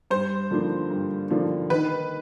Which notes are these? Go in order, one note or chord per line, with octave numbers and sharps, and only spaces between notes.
G2 C5
D3 F3 A#3 D4
G2
D3 F3 A#3 D4
D#3 B4